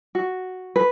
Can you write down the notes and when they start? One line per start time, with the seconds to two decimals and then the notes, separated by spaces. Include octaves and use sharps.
0.15 F#4
0.76 B4